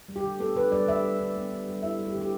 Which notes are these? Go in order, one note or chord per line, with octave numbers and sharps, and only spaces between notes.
G3
G4
D3
B3 A4
D3 B4
G3 D5
D3 E5
G3
D3
B3
D3
G3
E4 E5
G3
G4
D3
G4